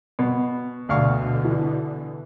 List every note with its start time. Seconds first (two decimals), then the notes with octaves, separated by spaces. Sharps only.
0.19 B2
0.89 D2 B2 D3 F5 C#6
1.45 E3